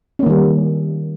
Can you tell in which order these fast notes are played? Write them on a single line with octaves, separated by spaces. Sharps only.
C#4 A#3 D#3 G3